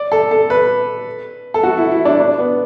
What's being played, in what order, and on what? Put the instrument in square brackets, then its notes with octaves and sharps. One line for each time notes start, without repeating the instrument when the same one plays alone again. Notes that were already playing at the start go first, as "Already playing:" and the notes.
Already playing: [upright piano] D5
A4
A4
B4
A4
F#4
E4
E4
D4
D4
B3